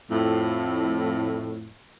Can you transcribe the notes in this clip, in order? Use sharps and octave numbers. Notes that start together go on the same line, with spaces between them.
F2 A2